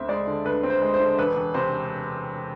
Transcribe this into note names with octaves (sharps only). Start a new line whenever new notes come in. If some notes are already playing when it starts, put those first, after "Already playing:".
Already playing: D2 C4 E5
G#3 D5
D3
D2 B4
C4
C5
G#3
C5
D3
E1 B4
E1
C3 C5